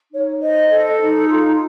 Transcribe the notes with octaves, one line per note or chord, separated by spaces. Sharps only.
D#4 C#5
C5 D#5
A4
D#4
F4